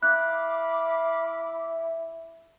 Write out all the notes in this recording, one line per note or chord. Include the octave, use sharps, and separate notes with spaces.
E4 F5 B5 D6 F#6